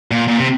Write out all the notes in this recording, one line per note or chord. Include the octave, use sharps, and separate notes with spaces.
A#2
A#2
C3